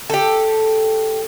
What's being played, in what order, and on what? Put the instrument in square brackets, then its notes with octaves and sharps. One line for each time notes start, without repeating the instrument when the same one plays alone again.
[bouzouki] G4 A4